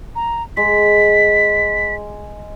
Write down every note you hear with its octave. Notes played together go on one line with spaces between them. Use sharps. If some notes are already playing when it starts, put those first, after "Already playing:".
A#5
G#3 B6